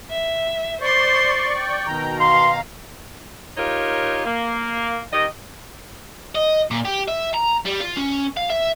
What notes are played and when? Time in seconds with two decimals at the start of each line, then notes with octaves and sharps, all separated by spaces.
0.11 E5
0.81 C5 D5 C6 C#6
1.57 G5
1.87 B2 D#3 A#5
2.20 F5 C6
3.57 D#4 F4 G4 A#4 C#5
4.25 A#3
5.12 D#3 G4 D#5
6.35 D#5
6.71 A#2
6.85 G4
7.08 E5
7.33 A#5
7.65 G3
7.80 F4
7.97 C#4
8.37 F5
8.50 E5